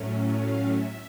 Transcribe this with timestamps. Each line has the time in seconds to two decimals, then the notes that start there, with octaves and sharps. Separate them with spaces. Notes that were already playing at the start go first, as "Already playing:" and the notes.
Already playing: A2 F#3 A3 C#4
0.36 F5
0.68 E5